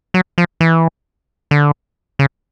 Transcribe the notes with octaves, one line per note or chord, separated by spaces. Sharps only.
F#3
F3
E3
D3
C#3